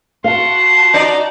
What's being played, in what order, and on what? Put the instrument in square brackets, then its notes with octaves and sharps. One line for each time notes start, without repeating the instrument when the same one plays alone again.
[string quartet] F#4 F#5 A5 [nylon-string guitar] F5 [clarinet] C6
[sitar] D#4 D5